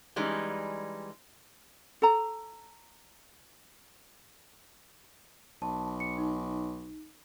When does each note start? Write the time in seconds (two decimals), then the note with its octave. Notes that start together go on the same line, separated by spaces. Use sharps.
0.16 E3 G3 G#3 C#4 D#4
2.02 A4 A#5
5.62 B1 A5
6.00 C#7
6.18 D#4